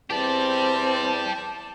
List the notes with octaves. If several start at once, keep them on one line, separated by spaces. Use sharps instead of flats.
E2 C4 G4 D5 A5